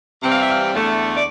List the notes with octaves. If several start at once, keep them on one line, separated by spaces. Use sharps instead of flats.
C3 E3 G3 C4
F5
E5
F5
E2 D3 A3
D5